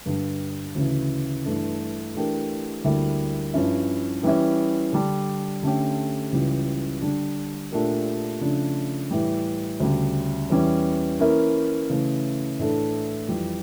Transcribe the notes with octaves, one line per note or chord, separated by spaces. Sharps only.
G2 D3 G3
D2 C#3 E3
G2 E3 A3 D4
E3 A3 D4 G4 A#4
D2 D3 G3 A#3 E4
G2 F3 C#4 E4
E3 G3 C#4 E4
D3 G3 D4
D3 A3 C#4 G4
C#2 C#3 E3 G3
D3 G3 D4
A#2 A3 D4 G4 A#4
C#3 F3 A3 D4
A2 E3 G3
D2 C#3 G3
E2 E3 G3 C#4
E3 A#3 C#4 E4 A#4
C#3 E3 A3
A2 E3 A3 D4 A4
F2 E3 G3